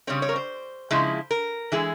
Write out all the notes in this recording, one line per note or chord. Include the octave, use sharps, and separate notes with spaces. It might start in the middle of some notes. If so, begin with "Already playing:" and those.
C#3 G3 C4 C#5
C#5
A#4
C5
C#3 F3 G#3 E4
A#4
E3 G#3 E4 G#4